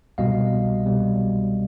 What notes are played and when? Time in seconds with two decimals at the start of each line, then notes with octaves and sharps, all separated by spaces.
0.18 C2 B2 G3 D#5 F5
0.86 C2 B2 G3